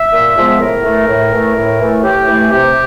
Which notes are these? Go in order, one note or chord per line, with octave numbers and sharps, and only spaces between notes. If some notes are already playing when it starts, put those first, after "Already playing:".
Already playing: E5
A#2
F3 G#3 B3
A2 A#4
E3 A3
A2
E3 A3
A2
E3 A3
A2 G4
E3 A3
C3 G4